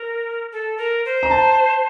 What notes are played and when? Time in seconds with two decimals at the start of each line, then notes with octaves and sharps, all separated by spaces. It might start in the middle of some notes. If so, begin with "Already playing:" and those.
Already playing: A#4
0.52 A4
0.78 A#4
1.05 C5
1.23 A#5
1.31 A5